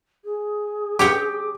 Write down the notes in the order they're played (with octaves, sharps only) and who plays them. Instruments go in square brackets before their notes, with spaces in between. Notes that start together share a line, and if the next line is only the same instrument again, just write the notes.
[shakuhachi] G#4
[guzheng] G4 C#5 G5 [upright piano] D6